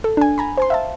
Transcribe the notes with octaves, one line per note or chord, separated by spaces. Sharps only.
A4
D4 G#5
G#5 A#5 B5
C5 G#5 C6
E5 F5 A5